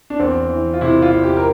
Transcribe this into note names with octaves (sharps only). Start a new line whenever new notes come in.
D4
E2 C4
E3
F4
C3 E4
F4
E2
G4
A#4